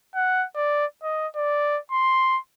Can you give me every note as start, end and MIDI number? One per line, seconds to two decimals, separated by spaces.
0.15 0.46 78
0.56 0.86 74
1.03 1.27 75
1.36 1.79 74
1.92 2.39 84